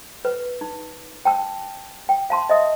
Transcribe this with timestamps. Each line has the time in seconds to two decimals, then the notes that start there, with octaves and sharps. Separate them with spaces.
0.25 B4
0.61 D#4
1.25 G5 A5 E6
2.09 G5
2.30 F5 A5 C6
2.50 D#5 E5 D#6